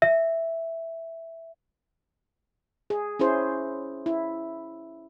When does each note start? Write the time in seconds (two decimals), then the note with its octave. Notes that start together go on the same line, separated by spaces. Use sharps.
0.02 E5
2.90 G#4
3.19 C#4 E4 G#4 C5
4.06 E4